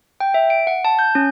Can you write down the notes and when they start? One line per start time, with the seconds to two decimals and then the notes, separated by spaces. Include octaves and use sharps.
0.20 G5
0.34 E5
0.50 D7
0.67 F#5
0.85 A5
0.99 G6
1.15 C#4